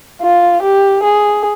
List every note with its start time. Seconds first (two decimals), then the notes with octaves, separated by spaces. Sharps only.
0.22 F4
0.62 G4
1.03 G#4